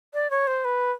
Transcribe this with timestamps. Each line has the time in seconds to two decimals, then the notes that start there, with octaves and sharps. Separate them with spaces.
0.14 D5
0.30 C#5
0.47 C5
0.65 B4